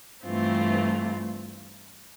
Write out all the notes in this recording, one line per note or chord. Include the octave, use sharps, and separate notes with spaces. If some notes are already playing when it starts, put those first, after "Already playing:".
G2 E3 A3 C4 F4